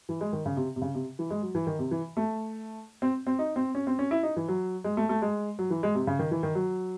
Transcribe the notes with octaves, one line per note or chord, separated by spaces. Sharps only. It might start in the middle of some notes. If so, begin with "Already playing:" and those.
E3
G#3
D#3
C#3
C3
C3
C#3
C3
E3
G#3
F#3
E3
D#3
C3
E3
A3
C4
C4
D#4
C4
C#4
C4
C#4
E4
D#4
E3
F#3
G#3
A3
A3
G#3
F#3
E3
G#3
C3
C#3
D#3
E3
D#3
F#3